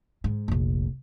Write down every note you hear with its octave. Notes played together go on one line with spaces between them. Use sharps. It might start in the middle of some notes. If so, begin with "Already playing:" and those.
G#2
F1 A#1